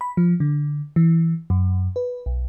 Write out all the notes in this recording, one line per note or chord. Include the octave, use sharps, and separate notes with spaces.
B5
F3
D3
E3
F#2
B4
B1